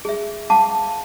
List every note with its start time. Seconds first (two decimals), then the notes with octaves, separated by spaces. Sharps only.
0.05 G#4 E5
0.50 F5 F#5 A5 D6